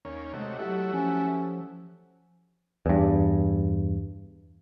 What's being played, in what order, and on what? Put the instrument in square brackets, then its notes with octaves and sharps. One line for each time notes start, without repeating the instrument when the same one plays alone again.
[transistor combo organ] D#2 A#3 C#4 [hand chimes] C#5
[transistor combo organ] C3 A3 F#4 [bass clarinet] G#3 [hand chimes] D#5
[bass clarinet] F#3 [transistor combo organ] A3 E4 F#4 [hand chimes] G4 A4 F#5
[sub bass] F3 [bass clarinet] C#4
[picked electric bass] E2 G2